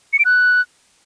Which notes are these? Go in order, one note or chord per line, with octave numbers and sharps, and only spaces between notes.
C#7
D7
F#6